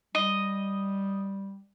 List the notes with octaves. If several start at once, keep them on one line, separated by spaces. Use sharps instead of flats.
G3 D#5